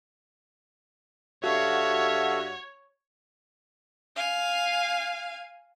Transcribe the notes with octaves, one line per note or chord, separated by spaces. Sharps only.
G2 F#4 A4 C#5 E5 F5
F5 G#5